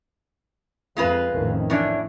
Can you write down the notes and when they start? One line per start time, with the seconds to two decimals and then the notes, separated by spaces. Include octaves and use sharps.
0.97 F2 G#3 F4 B4
1.33 A1 F2 D#3
1.70 A2 E3 D4